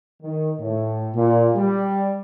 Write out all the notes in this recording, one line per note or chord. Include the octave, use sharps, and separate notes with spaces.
D#3
A2
A#2
G3